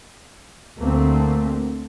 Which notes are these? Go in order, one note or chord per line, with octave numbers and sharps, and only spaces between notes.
D2 A3 A#3 C4